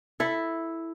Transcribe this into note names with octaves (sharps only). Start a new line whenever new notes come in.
E4 A4